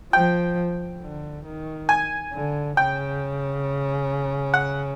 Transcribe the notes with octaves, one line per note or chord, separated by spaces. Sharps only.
F3 G5
D3
D#3
G#5
D3
C#3 G5
F#5